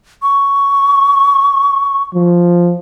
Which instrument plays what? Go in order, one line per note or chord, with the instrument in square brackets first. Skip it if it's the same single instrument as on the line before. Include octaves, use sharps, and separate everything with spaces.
[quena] C#6
[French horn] F3